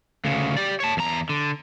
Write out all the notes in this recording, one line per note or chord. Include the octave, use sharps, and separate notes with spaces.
D2 C#3
G4 D5
C#5 A5
E2 A#5
D3